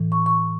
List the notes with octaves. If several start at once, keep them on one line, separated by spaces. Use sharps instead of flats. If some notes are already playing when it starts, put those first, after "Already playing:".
Already playing: A2 E3
C#6
C#6